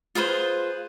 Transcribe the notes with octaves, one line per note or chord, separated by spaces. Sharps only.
F4 G#4 B4 C5